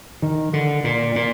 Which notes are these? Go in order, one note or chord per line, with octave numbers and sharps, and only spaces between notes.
D#3
D3
A#2
A#2